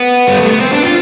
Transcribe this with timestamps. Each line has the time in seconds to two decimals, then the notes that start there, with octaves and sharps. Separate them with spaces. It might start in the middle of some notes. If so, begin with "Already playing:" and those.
Already playing: B3
0.27 G3
0.39 A3
0.50 B3
0.60 C4
0.72 D4
0.83 F4